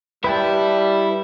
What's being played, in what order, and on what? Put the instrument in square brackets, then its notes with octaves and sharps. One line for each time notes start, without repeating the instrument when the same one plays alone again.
[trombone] G3 [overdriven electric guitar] E4 [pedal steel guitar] B4 G5 A5